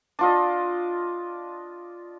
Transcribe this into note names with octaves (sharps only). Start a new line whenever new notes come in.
D4 F4 D#5